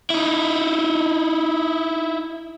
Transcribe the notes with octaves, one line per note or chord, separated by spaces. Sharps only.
D#4 E4